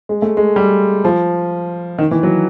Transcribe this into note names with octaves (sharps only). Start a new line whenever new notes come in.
G#3
A3
G#3
G3
F3
D#3
E3
F#3